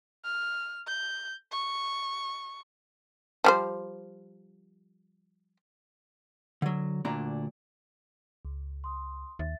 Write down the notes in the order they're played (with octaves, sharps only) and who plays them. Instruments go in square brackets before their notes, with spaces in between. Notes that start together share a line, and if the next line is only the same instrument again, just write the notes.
[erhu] F6
G6
C#6
[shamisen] F3 G3 C5
[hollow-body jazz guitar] D3 F#3
D2 A#2 D4 A#5
[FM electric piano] C#2
[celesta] C6 D#6
[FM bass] D#2 [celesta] E5 A6